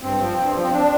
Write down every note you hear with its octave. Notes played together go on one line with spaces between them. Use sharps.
G2 C4
F3
G2
F3
C4
D4